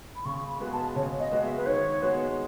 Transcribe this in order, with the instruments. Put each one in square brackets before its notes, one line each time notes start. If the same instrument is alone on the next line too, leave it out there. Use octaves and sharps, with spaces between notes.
[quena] B5
[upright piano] C#3 [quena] C#6
[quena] B5
[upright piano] G#3 B3 F#4
[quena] A5
[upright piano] C#3 [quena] C#5
[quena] D#5
[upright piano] G#3 B3 F#4
[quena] E5
B4
[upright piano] D#3 [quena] C#5
[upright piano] G#3 B3 F#4